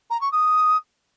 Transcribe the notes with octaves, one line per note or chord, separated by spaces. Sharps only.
A#5
C#6
D#6